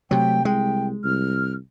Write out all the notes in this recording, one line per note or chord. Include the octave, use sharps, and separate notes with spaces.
C3 F#3 A3 G5
C2 G#3 G5
C2 F6